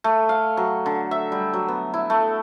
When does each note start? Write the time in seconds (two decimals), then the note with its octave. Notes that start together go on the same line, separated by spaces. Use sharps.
0.04 A3
0.29 F5
0.57 F#3
0.86 D3
1.11 E5
1.32 G3
1.53 F#3
1.68 B3
1.94 E4
2.10 A3